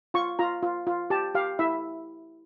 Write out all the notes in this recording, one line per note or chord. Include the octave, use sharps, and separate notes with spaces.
F4 C#6
F4 A#5
F4
F4
G4 A5
G4 F5
E4 E5